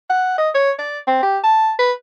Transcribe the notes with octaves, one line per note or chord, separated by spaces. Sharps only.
F#5
D#5
C#5
D5
C4
G4
A5
B4